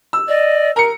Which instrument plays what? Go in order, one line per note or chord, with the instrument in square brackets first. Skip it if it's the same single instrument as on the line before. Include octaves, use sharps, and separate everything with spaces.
[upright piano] E6
[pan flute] D5 [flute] D#5
[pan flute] A#4 [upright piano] A#5 C#7